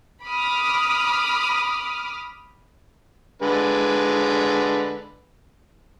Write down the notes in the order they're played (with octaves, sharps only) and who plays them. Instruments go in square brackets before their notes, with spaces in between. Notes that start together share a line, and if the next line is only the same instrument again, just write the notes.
[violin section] B5 D6 D#6 F6
[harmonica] D3 G#3 B4